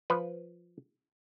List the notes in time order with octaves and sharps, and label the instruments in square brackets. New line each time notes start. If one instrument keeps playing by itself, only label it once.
[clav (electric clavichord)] F3 B4